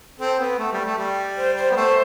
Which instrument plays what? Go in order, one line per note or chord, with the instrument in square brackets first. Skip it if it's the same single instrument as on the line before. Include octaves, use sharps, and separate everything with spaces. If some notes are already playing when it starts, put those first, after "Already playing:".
[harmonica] C4 [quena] A4
[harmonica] B3
A3
G3
A3
G3
[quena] C5
C5
[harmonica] B3
[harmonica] A3 [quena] C5